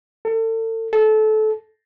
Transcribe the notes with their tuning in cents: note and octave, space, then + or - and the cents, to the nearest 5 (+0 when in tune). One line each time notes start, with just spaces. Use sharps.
A4 +35
A4 -25